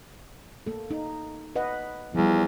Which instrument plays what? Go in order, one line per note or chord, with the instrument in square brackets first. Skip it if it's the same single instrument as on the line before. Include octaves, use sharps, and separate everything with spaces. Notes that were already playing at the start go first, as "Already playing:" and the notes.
[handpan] A#3 A4
D#4
B4 D#5 F#5
[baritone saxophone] E2 [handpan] F3 G3